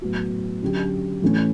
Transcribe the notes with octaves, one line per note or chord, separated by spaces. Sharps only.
A2 F#3 B3 F#4
D3 F#3 C#4 G4
A2 E3 A3 C#4 E4